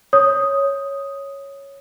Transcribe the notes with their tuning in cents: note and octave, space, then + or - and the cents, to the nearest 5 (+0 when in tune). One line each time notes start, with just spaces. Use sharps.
C#5 +0 D#6 +0